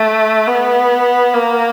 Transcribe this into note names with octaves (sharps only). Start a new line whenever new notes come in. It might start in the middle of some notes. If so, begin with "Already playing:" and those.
Already playing: A3
B3
A#3